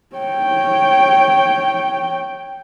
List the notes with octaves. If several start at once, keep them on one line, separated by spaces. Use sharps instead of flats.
C#5 G5